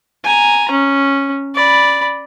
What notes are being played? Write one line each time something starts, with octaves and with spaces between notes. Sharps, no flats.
G#5 A#5
C#4
D5 B5